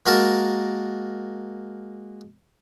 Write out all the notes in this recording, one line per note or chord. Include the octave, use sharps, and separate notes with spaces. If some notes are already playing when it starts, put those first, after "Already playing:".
G#3 A#3 F#4 A#4 A5